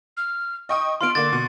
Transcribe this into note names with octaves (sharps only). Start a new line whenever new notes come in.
F6
D#5 G5 C#6 D#6
B3 F4 C6 F6 D7
D3 A#3 D6 A6
B2